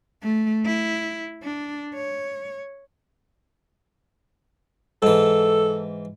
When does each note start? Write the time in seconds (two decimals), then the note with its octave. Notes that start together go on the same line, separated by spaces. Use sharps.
0.23 A3
0.66 E4
1.43 D4
1.94 C#5
5.03 G#2 E3 A4